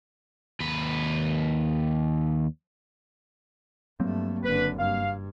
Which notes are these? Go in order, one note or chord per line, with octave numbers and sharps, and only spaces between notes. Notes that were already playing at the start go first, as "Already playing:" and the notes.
D#2 B4
G2 F#3 A3 A#3 C4
F#1 D3 B4
G2 F5